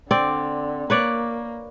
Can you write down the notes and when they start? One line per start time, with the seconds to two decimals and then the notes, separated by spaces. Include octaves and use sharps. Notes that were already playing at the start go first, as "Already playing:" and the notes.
0.11 D3 C4 D5
0.90 A#3 B4 C#5 D5